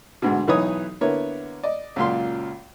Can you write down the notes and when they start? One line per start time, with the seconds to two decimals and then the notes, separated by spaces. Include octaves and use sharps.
0.22 D2 G#2 B2
0.47 B1 E3 D#4 B4 C#5 D#6
1.01 D3 A#3 B3 E4 C#5
1.63 D5 D#5
1.96 C#2 F#2 A#2 F5 C6